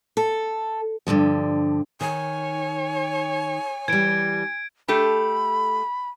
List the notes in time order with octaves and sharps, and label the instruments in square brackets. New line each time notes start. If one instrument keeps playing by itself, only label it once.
[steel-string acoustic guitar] A4
G2 D3 D#3 F3
[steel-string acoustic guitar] D#3 [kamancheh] C#5 [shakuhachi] G#5
[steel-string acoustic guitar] E3 G3 [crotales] G#6 D7
[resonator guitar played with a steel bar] A3 G4 A4 [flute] B5